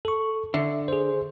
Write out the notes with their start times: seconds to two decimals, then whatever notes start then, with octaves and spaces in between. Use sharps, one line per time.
0.05 A4 C#6
0.54 D3 E5
0.88 G#4 C5